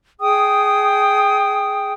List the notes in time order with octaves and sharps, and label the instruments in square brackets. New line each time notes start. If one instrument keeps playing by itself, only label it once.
[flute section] G#4 G5 D#6